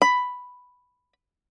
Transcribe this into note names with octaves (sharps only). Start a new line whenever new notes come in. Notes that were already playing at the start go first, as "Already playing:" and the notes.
B5